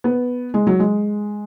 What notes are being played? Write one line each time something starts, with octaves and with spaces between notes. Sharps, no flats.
B3
G#3
F#3
G#3